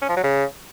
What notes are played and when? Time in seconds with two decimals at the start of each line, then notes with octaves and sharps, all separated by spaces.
0.02 C#4
0.09 F3
0.16 F#3
0.24 C#3